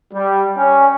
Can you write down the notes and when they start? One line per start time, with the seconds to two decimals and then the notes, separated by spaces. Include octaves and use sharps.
0.13 G3
0.57 C#4